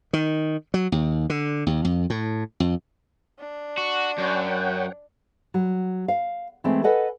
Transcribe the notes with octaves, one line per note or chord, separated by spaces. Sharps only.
D#3
F#3
D#2
D3
D#2
F2
A2
F2
D4
F#4
F#2 C#5 F#5 G5
F#3
F5
E3 G#3 A3 C4
A4 B4 D#5 F#5 G#5